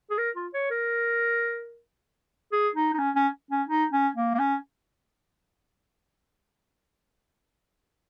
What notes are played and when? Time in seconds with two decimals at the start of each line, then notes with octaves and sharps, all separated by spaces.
0.10 G#4
0.18 A#4
0.35 F4
0.54 C#5
0.71 A#4
2.52 G#4
2.75 D#4
2.93 D#4
2.98 C#4
3.15 C#4
3.51 C#4
3.68 D#4
3.92 C#4
4.16 A#3
4.34 A#3
4.39 C#4